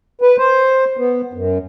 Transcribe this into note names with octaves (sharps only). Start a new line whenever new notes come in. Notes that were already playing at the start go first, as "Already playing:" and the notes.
B4
C5
B3
F#2